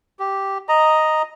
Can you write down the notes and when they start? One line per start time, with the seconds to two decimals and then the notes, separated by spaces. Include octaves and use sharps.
0.19 G4
0.69 D#5 A#5